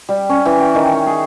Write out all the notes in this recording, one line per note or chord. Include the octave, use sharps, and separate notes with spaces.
G3
C#4
E3
G5
D#3
C#5
G#4